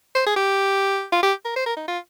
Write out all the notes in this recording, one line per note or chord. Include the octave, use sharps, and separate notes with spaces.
C5
G#4
G4
F4
G4
A#4
C5
A#4
D#4
F4